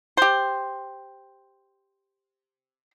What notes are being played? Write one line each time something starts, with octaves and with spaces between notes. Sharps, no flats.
G4 C5